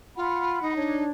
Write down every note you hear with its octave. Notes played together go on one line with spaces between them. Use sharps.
F4 F#5 B5
D#4
D4 C#5